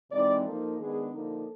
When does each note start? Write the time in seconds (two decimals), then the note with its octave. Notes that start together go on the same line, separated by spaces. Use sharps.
0.10 C3 E3 G#3 C4 D#4 D5
0.44 F3 A#3 D#4 A4
0.78 D#3 G#3 B3 D4 G#4
1.12 D3 F3 A#3 D#4 A4